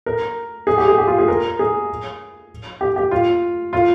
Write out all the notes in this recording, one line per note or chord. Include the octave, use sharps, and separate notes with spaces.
A#4
G#4
G4
G#4
G4
F4
G#4
A#4
G#4
G4
G4
F4
F4